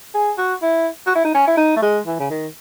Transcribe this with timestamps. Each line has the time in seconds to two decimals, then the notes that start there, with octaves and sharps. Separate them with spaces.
0.14 G#4
0.38 F#4
0.62 E4
1.07 F#4
1.15 E4
1.25 D#4
1.34 C#4
1.47 E4
1.57 D#4
1.76 A3
1.82 G#3
2.06 E3
2.20 C#3
2.30 D#3